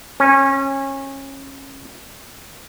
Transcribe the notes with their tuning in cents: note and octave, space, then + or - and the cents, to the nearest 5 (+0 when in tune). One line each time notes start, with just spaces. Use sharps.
C#4 -25